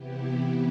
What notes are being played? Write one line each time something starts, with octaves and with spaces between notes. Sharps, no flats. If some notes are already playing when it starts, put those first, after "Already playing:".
Already playing: C3 E3 B3 E4 G4